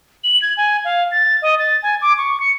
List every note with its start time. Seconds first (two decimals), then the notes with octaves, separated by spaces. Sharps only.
0.24 F#7
0.42 G#6
0.57 G#5
0.85 F5
1.11 A6
1.42 D#5
1.59 A6
1.83 G#5
2.02 D6
2.18 C#6
2.40 C#7